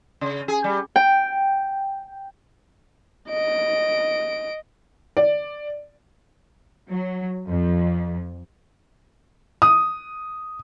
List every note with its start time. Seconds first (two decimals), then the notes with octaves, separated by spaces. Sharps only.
0.21 C#3
0.48 G#4
0.64 G3
0.96 G5
3.29 D#5 D7
5.17 D5
6.90 F#3
7.49 F2
9.62 D#6